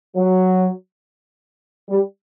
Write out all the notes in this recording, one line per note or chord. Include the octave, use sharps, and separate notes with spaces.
F#3
G3